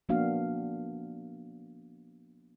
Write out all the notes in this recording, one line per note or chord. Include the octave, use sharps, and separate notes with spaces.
F3 A#3 B3 D4 F#4 F5